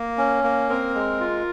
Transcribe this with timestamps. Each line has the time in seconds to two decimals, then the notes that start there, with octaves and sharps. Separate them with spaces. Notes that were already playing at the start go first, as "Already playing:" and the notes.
Already playing: A#3
0.18 C#4
0.44 A#3
0.69 C4 A#4
0.95 G#3
1.20 F4